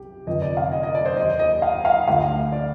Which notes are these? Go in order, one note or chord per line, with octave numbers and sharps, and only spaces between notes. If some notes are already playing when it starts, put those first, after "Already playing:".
Already playing: C2 G4
F1 F2 D3 F3 D#5
D5
F5
D#5
D#5
D5
C5
D#2 D#3 D#5
D#5
F5
F5
D2 D3 F3 F5
D5